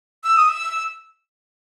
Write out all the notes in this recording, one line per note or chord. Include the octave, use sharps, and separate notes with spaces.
E6
D#6
E6